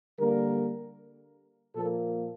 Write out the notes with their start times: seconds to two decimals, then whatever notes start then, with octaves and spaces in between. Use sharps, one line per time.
0.19 D3 G3 A#3 A#4
1.75 A#2 F3 A#3 A4